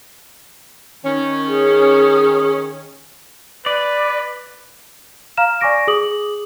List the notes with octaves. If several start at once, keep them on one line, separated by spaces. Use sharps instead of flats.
D#3 C#4
G#4
B4 D5
F5 A#5 F6 E7
D5 G#5 C#6 D6 A#6 D7
G#4 D6 D#6 F#7